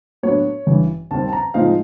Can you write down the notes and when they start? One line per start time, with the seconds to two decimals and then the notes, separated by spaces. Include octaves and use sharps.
0.23 A2 F#3 B3 D4 C#5
0.67 A1 G2 E3
1.11 D#2 D#3 G3 C4 A5
1.28 A5
1.33 A#5
1.54 A2 F3 G#3 C4 D#4 F5